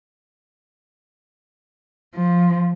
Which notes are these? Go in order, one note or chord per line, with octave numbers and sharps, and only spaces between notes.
F3